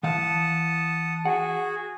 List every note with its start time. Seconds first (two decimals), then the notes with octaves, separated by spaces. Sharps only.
0.03 E3 F5 F#5 A5 D#6
1.25 F#4 G#4 F#5